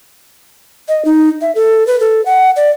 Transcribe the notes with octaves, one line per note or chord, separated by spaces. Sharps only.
D#5
D#4
E5
A4
B4
A4
F#5
D5